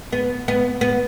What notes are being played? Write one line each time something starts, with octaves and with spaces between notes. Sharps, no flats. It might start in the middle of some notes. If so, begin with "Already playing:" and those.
B3
B3
B3